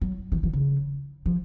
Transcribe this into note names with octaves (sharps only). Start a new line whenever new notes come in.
F#3
E3
F3
C#3
F3